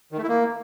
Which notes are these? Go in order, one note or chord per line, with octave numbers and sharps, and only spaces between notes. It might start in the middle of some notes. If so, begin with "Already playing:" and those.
D#3
A3
E4
A#3